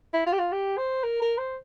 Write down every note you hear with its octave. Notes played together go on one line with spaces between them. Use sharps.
E4
F4
G4
F4
G4
C5
A#4
A#4
C5